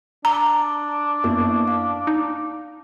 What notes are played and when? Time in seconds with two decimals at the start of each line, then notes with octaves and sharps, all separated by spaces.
0.25 D4 A#5
1.24 F#2 A#3 B3 E4
1.68 F5
2.07 D#4